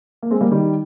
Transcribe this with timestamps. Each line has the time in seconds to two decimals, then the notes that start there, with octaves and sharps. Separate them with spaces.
0.23 A#3
0.30 G#3 C4
0.41 G3 A#3
0.51 D#3 G3